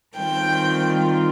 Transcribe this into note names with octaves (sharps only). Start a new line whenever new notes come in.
D#3 G3 C4 F4 G5